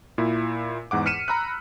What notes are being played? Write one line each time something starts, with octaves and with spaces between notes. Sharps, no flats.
A#2 E4
E2 G#2 F#5 D6
F6 B6 C#7 D#7 E7
A#5 B5 E6 F#6